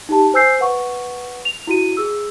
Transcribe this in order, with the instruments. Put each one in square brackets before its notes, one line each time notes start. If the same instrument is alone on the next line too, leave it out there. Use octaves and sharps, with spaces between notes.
[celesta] D#4 G4 A5
C5 G#5 E6 G6 C7
B4 F#5 C#6
F7
E4 F#4 D#7
G#4 E6